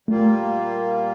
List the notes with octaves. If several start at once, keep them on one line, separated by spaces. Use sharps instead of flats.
A#2 G3 A3 A#3 F4